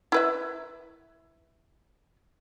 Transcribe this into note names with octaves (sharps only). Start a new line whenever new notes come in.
E4 B4 E5